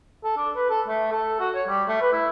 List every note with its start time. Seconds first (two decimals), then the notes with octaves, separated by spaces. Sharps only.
0.24 A4
0.37 D4
0.55 B4
0.70 A4
0.88 A3
1.12 A4
1.40 F#4
1.54 C#5
1.68 G3
1.88 A3
2.01 B4
2.12 E4